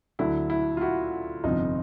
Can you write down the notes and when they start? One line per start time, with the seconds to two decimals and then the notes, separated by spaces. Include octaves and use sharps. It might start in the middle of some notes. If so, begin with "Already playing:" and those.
0.19 D2 D3 F#3 E4
0.50 E4
0.77 F4
0.81 E4 F#4
1.44 G1 F2 C3 F3 D#4 F4